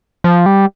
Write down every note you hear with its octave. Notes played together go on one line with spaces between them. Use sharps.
F3
G3